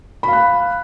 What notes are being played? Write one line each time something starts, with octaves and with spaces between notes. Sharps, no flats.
F5 B5 F#6